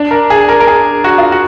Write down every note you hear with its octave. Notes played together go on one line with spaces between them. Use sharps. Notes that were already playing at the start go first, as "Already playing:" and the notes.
Already playing: D4
A#4
G#4
A#4
A#4
G#4
F#4
F4
F#4